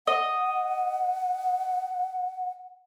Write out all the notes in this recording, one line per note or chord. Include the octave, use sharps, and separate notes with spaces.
D#5 F#5